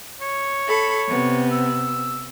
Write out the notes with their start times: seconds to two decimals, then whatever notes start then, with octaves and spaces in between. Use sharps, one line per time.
0.21 C#5
0.65 A4 B5
1.07 C3 B3
1.51 E6